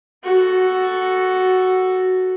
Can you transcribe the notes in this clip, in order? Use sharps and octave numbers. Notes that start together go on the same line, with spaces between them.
F#4 A4